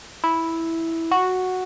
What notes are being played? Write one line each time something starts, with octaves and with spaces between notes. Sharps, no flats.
E4
F#4